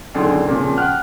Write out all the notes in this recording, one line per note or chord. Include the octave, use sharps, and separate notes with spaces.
A#1 F#2 D3 D#3 G#4 C6
A#2 C#3 F3
F#5 G5 F6 F#6